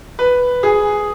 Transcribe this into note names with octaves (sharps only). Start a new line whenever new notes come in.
B4
G#4